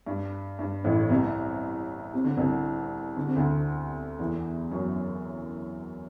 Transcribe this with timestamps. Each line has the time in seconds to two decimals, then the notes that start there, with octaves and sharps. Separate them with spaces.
0.06 G2
0.59 G2
0.84 A1 A2
1.09 C2 C3
2.14 C3
2.24 D3
2.36 C2 C3
3.17 D3
3.27 C3
3.36 D2 D3
4.19 E2 E3
4.71 F#2 F#3